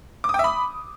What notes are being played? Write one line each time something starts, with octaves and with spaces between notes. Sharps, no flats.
D6
D#6
G5
E5
B5